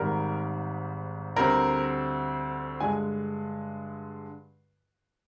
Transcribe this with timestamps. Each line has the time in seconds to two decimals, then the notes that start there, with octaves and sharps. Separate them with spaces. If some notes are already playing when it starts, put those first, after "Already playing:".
Already playing: G#1 G#2 G3 A#4
1.36 D2 D3 G3 C4 A#4
2.80 G2 D3 G#3 G#5